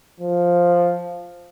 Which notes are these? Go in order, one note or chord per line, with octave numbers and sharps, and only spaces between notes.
F3